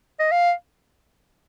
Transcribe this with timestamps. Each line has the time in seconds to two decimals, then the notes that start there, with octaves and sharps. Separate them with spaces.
0.19 D#5
0.31 F5